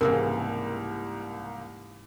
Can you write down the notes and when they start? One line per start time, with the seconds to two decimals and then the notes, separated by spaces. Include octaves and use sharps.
0.01 C2 G#2 C#3 E3 A#3 A#4 F#5